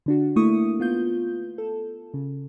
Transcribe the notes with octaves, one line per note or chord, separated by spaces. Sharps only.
D3 D4 F#4
A3 A#3 E4 C#6 D#6
B3 F4 G6
A4
C#3